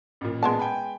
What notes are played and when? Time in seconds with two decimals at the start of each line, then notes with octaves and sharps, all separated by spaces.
0.21 A1 A#2
0.43 G#3 B3 A5
0.59 G5 G#5 B5